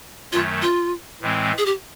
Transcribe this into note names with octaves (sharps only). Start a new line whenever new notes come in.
F#2 D#3 F#3 A3 F4
F4
A2 E3 G#3 C4
G#4
G4